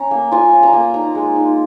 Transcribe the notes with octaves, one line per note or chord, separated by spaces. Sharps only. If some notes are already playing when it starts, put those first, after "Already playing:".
Already playing: C#4 A#5
A#3
F4 G#5
C#4
A#5
A#3
D#4 A#5
G#3
D#4